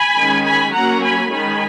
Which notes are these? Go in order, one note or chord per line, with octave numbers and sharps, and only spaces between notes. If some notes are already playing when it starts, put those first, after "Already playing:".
Already playing: G#5 B5
D#3 G#3 C#4
G#5 B5
F#3 A#3 C#4 F#5 A#5
G#5 B5
D#3 G#3 C#4 G#5 B5